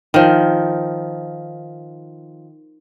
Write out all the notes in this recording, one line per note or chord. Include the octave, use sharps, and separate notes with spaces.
D#3 F3